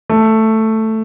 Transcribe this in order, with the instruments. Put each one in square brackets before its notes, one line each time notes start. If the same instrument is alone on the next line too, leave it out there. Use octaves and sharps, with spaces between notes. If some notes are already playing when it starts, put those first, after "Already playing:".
[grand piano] A3